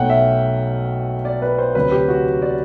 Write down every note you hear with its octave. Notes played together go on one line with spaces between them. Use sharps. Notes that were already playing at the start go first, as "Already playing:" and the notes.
Already playing: B1 B2 F#3 A3 F#5 G5
E5
D5
B4
C5
D2 C3 F#3 B4
G4
F#4
D5